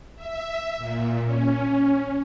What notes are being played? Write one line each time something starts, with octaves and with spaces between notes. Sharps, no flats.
E5
A#2
C#4